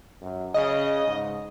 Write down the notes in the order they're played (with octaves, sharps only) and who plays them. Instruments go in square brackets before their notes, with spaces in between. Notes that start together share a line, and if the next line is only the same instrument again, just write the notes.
[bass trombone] F#2
[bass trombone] C#3 [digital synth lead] D#5
[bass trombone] G#2